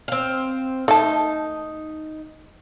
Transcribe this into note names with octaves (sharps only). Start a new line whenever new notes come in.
C4 F5
A3 D#4 A5